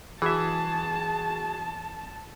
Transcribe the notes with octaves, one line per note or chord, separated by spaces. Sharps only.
E3 F#4 G#4 E5 A5